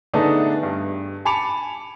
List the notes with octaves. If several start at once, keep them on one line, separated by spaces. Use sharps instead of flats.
D3 A3 B3 D4 D#4 G#4
G2
G#5 A5 B5 D6 C#7 F7